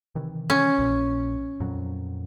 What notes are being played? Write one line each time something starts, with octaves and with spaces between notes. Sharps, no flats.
C3 D#3 E3
C#4
A#1 A#2
F2 A#2 F#3